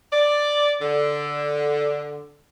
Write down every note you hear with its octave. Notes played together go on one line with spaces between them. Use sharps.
D5
D3